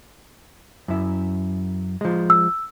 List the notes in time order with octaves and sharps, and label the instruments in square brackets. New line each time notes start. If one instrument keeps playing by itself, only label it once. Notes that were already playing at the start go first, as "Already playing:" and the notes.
[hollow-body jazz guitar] F#2 E4
F3 G#3
[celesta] E6